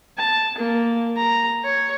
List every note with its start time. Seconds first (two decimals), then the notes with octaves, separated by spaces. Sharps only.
0.17 A5
0.58 A#3
1.16 A#5
1.65 C#5